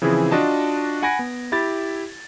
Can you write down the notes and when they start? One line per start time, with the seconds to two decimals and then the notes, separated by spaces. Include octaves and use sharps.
0.02 C#3 E3 F3 C4 E4 G#4
0.32 D4 F4 F#4 D#5 A5
1.02 F#5 G#5 B5 G#6 A#6 D7
1.19 B3
1.52 E4 G4 B5 A6